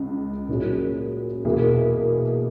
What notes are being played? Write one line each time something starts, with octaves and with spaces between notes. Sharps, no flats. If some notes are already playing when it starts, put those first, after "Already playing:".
Already playing: C#2 C#3
A#2 F#3 C#4 G#4
E2 B2 A#3 E4 G#4